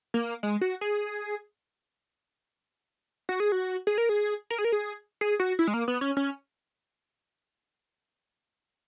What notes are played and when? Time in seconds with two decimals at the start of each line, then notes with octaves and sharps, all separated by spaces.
0.14 A#3
0.43 G#3
0.61 F#4
0.81 G#4
3.29 F#4
3.40 G#4
3.52 F#4
3.87 G#4
3.98 A#4
4.09 G#4
4.50 A#4
4.58 G#4
4.65 A#4
4.72 G#4
5.21 G#4
5.40 F#4
5.59 E4
5.67 G#3
5.74 A#3
5.88 B3
6.01 C#4
6.17 C#4